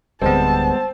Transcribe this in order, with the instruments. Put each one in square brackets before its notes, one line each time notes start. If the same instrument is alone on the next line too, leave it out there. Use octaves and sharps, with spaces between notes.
[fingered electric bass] D1 D3 [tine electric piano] G3 G#3 B3 [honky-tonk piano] C4 [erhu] A5